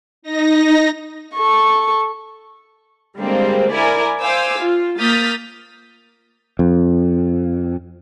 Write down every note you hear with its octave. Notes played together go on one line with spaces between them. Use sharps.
D#4 A#6
A4 C#6
D3 G3 G#3 A#3 C4
E4 A#4 D5 G#5
C5 F5 G#5 D6 E6
F4
A#3 D#6 F6 G6 A6 B6
F2